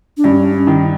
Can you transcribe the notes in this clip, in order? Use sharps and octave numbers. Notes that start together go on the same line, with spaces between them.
D4
G2 C#4
D#3